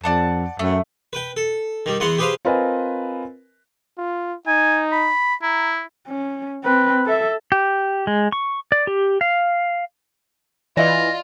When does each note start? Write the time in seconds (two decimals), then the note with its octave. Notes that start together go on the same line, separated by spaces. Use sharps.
0.04 F2 D5 F#5 A5
0.59 F#2 A3
1.13 B4 G5
1.37 A4
1.86 D#3 G3
2.00 E2 E3 B3 F#5 C6
2.18 G4 G#4 B4 C5 F5
2.45 C4 F4 A#4 B4 D#5 G#5
3.98 F4
4.47 D#4 G#5
4.92 B5
5.42 E4 A#5
6.08 C#4
6.64 C4 B4
7.06 A4 E5
7.52 G4
8.07 G#3
8.32 C#6
8.72 D5
8.87 G4
9.21 F5
10.77 E3 F4 D5 D#5 A#6